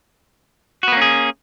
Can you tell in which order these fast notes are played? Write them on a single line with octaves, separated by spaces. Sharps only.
F#4 B3 A#3 C#4 G#4